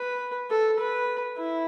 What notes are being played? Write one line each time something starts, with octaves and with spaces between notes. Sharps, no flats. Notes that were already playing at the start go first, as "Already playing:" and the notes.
Already playing: B4
A4
B4
E4